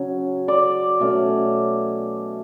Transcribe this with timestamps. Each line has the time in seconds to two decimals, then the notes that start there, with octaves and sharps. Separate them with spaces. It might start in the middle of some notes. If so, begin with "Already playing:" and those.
Already playing: C#3 F#3
0.48 D5
1.00 B2 A3 C#4